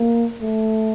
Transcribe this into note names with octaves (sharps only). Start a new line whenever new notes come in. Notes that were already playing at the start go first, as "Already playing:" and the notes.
Already playing: A#3
A3